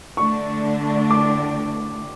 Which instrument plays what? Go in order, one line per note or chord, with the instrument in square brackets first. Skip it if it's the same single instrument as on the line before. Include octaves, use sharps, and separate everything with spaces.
[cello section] D3 A3 D4 [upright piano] C#6
[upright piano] D6